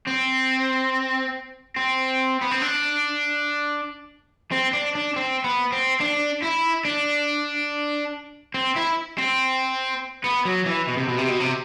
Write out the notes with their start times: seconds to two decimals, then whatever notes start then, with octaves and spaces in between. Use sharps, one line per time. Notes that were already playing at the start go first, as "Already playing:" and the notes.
0.07 C4
1.76 C4
2.41 B3
2.51 C4
2.62 D4
4.52 C4
4.73 D4
4.95 D4
5.16 C4
5.44 B3
5.72 C4
6.00 D4
6.42 E4
6.85 D4
8.54 C4
8.76 E4
9.18 C4
10.24 B3
10.45 F#3
10.66 E3
10.88 B2
10.97 C3
11.09 B2
11.19 C3
11.29 B2
11.40 C3